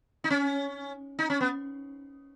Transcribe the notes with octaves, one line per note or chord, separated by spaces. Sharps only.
D#4
C#4
D#4
C#4
B3